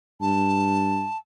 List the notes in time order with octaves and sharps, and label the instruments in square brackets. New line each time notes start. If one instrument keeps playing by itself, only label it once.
[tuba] G2 [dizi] A5